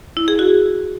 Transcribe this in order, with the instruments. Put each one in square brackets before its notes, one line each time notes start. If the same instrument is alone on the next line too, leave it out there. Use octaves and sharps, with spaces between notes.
[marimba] E4
G#4
F#4